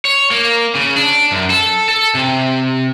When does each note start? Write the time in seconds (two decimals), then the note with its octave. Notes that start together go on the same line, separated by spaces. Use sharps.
0.05 C#5
0.31 A#3
0.75 C#3
0.96 D4
1.32 F#2
1.50 A4
1.89 A4
2.15 C3